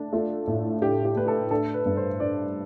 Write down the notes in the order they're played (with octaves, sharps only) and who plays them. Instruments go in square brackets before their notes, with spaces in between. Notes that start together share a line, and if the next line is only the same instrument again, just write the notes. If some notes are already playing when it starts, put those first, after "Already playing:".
Already playing: [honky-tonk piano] A3 D4
[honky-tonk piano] A3 [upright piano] F4
[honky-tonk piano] A2
[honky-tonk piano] D4 [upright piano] G4
[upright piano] G4
[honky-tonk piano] A3 [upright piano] B4
[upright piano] A4
[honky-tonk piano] D4 [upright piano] A4
[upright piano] B4
[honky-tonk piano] G2
[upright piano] C5
[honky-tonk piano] D4 [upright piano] D5